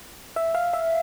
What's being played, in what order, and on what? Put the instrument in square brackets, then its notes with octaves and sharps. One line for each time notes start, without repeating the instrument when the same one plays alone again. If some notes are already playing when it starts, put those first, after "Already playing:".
[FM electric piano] E5
F5
E5